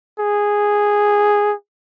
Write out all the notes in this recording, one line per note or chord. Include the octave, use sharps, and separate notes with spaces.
G#4